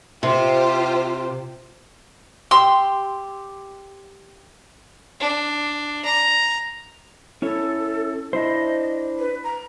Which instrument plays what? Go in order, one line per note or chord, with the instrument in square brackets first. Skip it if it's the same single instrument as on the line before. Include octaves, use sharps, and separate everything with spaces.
[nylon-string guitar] C3 [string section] F4 G4 C5
[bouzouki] G4 [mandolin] C6 E6
[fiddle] D4
A#5
[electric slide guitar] C#4 E4 C#5 [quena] A4
[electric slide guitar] D4 E4 C5 [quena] D#5
[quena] B4
A#5